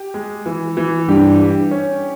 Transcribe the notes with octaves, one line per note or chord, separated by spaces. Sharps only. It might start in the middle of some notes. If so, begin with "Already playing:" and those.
Already playing: G4
G#3
E3
E3
G2 G4
G4
C#4